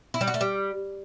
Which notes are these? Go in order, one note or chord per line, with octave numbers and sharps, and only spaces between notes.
E4
G3
F#4
A3
G3